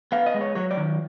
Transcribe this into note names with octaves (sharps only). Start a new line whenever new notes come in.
B3 F5
D#5
G#3
C#5
F#3 C#5
D5
D#3